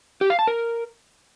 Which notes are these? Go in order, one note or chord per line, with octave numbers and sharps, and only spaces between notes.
G4
F5
A5
A#4